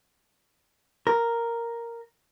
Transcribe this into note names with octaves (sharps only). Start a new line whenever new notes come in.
A#4